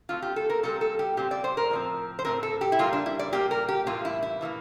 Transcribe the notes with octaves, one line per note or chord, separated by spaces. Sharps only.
D3 A3 C4 F4
G4
A4
A#4
A#2 G3 C4 A4
A4
G4
A#2 G3 C4 G4
D5
C5
A#4
A2 F3 C4
C5
A2 F3 C4 A#4
A4
G4
E4
A#2 G3 A#3 F4
D4
E4
D5
A#2 G3 A#3 G4
A#4
G4
A2 E3 G3 A#3 F4
E4
E4
A2 E3 G3 A#3